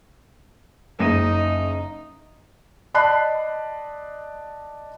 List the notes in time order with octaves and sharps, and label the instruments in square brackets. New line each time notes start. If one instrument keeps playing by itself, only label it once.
[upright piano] F#1 A#6 D#7 [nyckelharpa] D#4
[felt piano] D5 D#5 A5 B5 F#6 C7